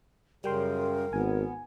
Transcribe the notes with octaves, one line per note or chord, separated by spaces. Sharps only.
F#2 C#3 G3 A#4 G5 C6
G#1 B3 G#5